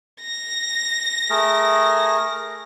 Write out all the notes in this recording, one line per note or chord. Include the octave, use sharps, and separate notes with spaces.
A#6
A3 G#4 A#4